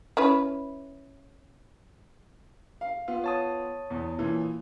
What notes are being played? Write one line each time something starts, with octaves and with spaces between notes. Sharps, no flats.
C#4 E4 B4
F5
B3 F4
C#5 A5 D#6
E2
A#2 E3